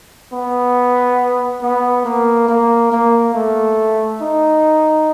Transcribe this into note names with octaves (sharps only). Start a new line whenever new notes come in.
B3
B3
A#3
A#3
A#3
A3
D#4